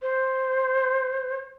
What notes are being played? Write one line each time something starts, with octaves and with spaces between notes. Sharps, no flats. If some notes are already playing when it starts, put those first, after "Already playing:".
C5